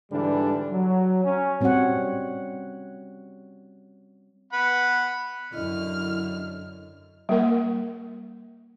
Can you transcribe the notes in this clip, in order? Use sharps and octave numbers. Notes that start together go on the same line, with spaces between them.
G#2 D3 E3 G3 D4
F#3
C#4
G3 C4 C#4 F#4 C#5 F#5
F#5 B5
F#2 D3 E4 D#5 F6
G3 A#3 A#4 F#5